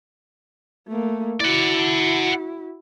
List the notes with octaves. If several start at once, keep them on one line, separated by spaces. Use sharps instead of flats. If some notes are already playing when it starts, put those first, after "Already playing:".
A3 A#3
E4 F#4 D5 F#5